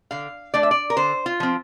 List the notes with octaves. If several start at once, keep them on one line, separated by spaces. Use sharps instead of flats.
D3 F5
A3 D4 D5
E5
D5
A#4
D3 C5
F4
F3 C4